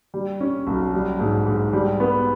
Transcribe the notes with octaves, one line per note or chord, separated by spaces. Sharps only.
G3
C#4
B1
G3
G#2
G#2
G3
B3